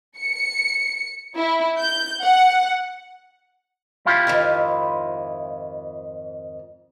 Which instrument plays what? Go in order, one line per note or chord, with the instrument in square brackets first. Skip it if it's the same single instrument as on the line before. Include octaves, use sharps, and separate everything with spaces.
[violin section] C#7
E4
G6
F#5
[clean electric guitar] E4 F4 G4
[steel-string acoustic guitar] F2 G#2 D#3